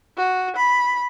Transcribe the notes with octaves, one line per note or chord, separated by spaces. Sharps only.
F#4
B5